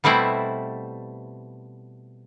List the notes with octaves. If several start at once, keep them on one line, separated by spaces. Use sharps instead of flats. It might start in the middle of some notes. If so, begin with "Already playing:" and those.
B2 G3 A3 C4 E4